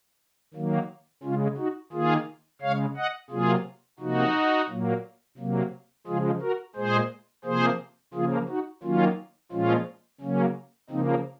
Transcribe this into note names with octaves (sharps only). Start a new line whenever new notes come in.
D#3 F#3 A#3
C#3 G#3 C#4 F4
D#4 F#4
D#3 A#3 F4 G#4
C#3 G#3 C#5 F5
D#5 F#5
C3 F#3 A#3 F4 G#4
C3 F3 A#3 D#4 F#4
A#2 F#3 A#3
C3 F#3 A#3
C#3 F3 G#3 F4 G#4
F#4 A#4
A#2 G#3 G#4 C5
C3 F3 A#3 G#4 C5
C#3 F3 A#3 F4 G#4
D#4 F#4
D#3 F#3 A#3 C#4 F4
A#2 F3 G#3 C#4 F4
C#3 F#3 A#3 C#4
C#3 F3 A#3 C4 D#4